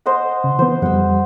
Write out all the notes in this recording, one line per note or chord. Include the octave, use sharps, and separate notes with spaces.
C5 D#5 F#5
C#3
E3 B3 C5
F2 G3 F#5 E6